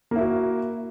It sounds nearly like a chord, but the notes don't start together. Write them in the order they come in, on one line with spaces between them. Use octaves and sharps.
A#3 E4 F#4